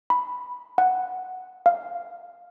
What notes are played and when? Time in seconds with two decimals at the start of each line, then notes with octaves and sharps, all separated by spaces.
0.10 B5
0.78 F#5
1.66 F5